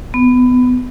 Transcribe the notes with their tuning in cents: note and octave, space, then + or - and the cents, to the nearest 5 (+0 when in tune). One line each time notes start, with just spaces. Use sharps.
B3 +20